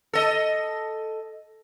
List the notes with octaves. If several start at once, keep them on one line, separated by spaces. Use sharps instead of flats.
A4 D#5